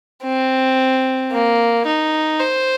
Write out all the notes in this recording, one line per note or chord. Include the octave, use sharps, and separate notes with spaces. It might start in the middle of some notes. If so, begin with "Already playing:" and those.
C4
A#3
D#4
C5